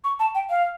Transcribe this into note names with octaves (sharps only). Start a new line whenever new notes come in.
C#6
A5
G5
F5